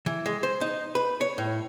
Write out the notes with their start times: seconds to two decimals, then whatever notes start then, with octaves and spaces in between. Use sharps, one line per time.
0.06 E3
0.26 G#3
0.43 C5
0.61 D#4
0.95 B4
1.21 C#5
1.38 A2